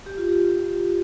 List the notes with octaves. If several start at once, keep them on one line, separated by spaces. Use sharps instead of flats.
G4
F4
G4